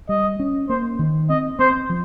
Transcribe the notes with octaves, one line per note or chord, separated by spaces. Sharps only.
G3 D#5
C#4
A#3 C5
D#3
C4 D#5
C4 C5
F3